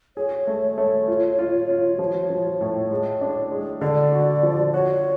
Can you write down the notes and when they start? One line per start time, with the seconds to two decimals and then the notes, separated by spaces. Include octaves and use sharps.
0.17 G#4 C#5
0.47 A3
0.78 A3
1.08 F4
1.39 F4
1.69 F4
1.99 F3
2.30 F3
2.61 A2
2.91 G#3
3.21 D4
3.51 G#3
3.81 D3 D5
4.12 F#4
4.43 F3
4.73 F#4 C#5